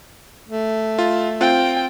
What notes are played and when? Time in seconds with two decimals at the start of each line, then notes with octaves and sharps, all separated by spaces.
0.48 A3
0.99 F4
1.41 C4 F4 G5